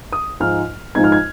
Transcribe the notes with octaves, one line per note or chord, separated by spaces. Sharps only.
D#6
G#2 F3 G#3 D#4 F6
G#2 F3 G#3 D#4 G#6
F6
G#6